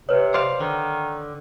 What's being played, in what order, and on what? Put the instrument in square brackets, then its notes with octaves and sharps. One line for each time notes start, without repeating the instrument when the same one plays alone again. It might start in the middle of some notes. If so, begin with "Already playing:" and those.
[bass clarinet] C3 [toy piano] B4 C#5
[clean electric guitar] C5 D5 F5
[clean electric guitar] D3 [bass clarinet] D#3